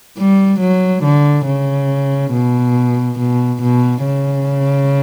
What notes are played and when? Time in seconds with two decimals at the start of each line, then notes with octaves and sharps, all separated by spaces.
0.17 G3
0.60 F#3
1.04 D3
1.46 C#3
2.32 B2
3.19 B2
3.63 B2
4.05 C#3